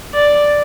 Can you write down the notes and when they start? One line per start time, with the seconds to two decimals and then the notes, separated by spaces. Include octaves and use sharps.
0.13 D5